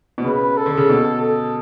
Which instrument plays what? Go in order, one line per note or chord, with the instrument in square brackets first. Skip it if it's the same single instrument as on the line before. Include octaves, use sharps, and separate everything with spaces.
[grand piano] B2
[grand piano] C#3 [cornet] B4
[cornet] A4
[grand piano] D3
C#3
B2
[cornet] A4